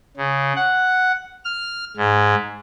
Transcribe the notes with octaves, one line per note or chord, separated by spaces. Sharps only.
C#3
F#5
F6
G#2